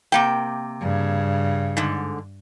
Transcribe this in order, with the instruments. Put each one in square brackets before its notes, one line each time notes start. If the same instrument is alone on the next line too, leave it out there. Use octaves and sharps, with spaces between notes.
[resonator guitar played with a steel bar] C3 A#3 G5
[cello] G2 [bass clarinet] C#3
[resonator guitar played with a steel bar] G#2 D3